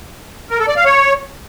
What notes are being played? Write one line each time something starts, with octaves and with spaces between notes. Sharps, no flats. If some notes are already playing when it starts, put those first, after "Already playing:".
A#4
A4
D5
F5
C#5